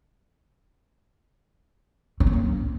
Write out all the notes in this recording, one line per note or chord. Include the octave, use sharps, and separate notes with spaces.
C#4
C4
A#3